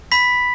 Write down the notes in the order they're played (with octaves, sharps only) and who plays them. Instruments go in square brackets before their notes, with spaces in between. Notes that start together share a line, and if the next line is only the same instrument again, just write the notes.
[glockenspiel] B5 B6